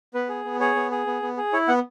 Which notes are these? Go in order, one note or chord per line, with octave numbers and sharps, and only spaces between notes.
B3 B4
G#4
B3
G#4 C#5
B3
G#4
B3
B3
G#4
E4 C#5
B3 F#5